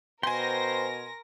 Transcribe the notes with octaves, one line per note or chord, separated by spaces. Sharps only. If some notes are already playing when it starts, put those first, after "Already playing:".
B2 A#4 C5 G5 G#5 C6 A#6